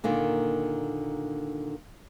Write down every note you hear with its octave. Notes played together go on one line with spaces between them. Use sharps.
A#2 D3 D#3 A#3